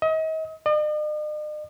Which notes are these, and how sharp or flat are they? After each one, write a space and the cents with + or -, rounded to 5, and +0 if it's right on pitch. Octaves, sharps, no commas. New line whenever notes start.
D#5 +40
D#5 -45